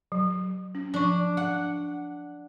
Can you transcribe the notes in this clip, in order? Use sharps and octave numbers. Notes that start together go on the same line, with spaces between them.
F#3
C#4
F3 D4 C#6
F#5